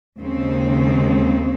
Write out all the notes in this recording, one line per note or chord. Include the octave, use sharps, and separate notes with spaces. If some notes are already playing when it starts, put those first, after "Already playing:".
D#2 C#3 G#3 C4